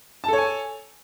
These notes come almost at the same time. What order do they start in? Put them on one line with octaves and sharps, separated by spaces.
A5 A4 C#5 G#5